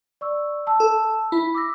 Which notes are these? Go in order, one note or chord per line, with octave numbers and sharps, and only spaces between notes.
D5 C#6 E6
A5 E6
A4
E4 B5
D6 E6 A#6